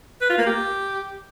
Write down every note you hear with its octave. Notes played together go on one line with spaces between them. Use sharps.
B4
F4
A#3
G4